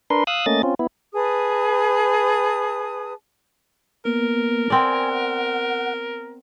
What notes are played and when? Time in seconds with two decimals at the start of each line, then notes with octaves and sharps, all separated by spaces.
0.10 D4 A#4 B4 C6
0.27 F5 D#6 E6 F#6
0.46 A3 A#3 C#4 D#5 A6
0.63 C4 C#4 F4
0.79 B3 E4
1.14 G#4 B4 A5 D#6
4.05 A#3 B3 A#4
4.70 B3 C4 D5 G#5
5.11 F#5